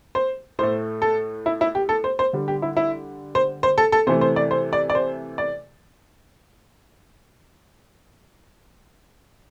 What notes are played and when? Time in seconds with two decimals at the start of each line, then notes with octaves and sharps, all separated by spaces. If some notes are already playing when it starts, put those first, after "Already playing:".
0.15 C5
0.59 A2 A3 C5
1.02 A4
1.46 E4
1.61 E4
1.75 G4
1.89 A4
2.04 C5
2.19 C5
2.33 D3 G3
2.48 G4
2.62 E4
2.77 E4
3.35 C5
3.63 C5
3.78 A4
3.92 A4
4.07 C3 E3 A3 C5
4.21 C5
4.36 D5
4.51 C5
4.73 D5
4.90 D5
4.95 C5
5.38 D5